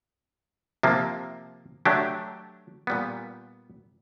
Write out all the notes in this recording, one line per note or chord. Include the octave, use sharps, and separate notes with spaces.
C3 F3 A#3
F#3 A3 D4 G4
A#2 G3 B3